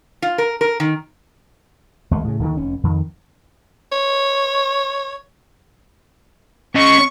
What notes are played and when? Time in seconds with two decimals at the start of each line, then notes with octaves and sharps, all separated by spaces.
0.22 F4
0.38 A#4
0.61 A#4
0.80 D#3
2.11 D#2 G#3 A3
2.24 A2 C#3
2.39 D#2 D3 D#3
2.57 F1 C#4
2.83 F2 D#3
3.92 C#5
6.75 C#4 D#5 C#6